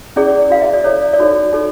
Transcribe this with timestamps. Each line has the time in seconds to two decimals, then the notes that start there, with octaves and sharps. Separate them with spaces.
0.16 C#4 E4 G#4 D5
0.28 D5
0.39 D5
0.50 F#4 B4 F5
0.61 E5
0.74 D5
0.84 E4 A4 C#5
1.02 D5
1.13 D5
1.18 D#4 F#4 A4 C#5
1.53 D#4 F#4 A4 C#5